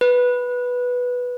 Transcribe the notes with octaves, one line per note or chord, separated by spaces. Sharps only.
B4